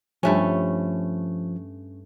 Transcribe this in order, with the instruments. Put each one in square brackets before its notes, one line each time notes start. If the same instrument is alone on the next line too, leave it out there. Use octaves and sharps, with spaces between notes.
[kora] G2 A3 C#4 [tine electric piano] F3